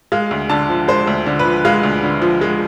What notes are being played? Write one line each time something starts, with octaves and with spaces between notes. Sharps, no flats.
G#3 F5
D2
D3 A5
F3
G#3 C5
D2
D3
B4
F3
G#3 F5
D2
D3
F3
G#3